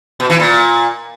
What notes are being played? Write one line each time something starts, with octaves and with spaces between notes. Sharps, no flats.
B2
E3
A#2